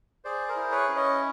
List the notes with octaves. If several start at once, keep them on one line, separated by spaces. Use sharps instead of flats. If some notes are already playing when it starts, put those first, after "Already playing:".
G#4 C5 D5
A#4 C5
E4
B4 C#5
C#4
C#5 D#5